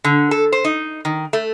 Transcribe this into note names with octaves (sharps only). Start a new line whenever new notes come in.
D3
A4
C5
D#4
D#3
A3